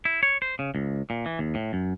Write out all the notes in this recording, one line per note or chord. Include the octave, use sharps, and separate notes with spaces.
E4
C#5
C5
C#3
C#2
A#2
E3
D#2
A2
F#2